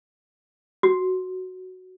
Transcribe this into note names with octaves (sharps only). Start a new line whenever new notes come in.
F#4